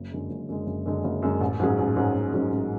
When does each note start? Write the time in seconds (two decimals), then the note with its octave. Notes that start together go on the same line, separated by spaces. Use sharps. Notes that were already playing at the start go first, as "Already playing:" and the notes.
Already playing: F#1
0.12 F#2 D3 G#3
0.29 F#1
0.49 F#2 D3 G#3
0.66 F#1
0.86 F#2 D3 G#3
1.04 F#1
1.22 F#2 D3 G#3
1.41 A1
1.60 G#2 F#3 C#4 G#4
1.78 A1
1.96 G#2 F#3 C#4 G#4
2.15 A1
2.33 G#2 F#3 C#4 G#4
2.52 A1